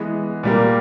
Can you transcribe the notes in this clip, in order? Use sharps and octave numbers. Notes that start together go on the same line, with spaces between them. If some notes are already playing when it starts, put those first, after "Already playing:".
Already playing: E3 G#3 B3
A#2 G3 A#3